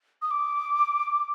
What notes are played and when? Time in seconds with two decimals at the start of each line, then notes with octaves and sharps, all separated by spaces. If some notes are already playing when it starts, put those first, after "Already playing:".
0.22 D#6
0.31 D6